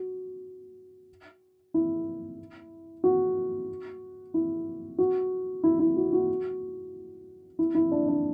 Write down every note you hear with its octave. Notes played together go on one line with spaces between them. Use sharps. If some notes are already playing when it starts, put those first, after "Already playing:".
Already playing: F#4
E4
F#4
E4
F#4
E4
E4
F#4
F#4
E4
E4
D4
D4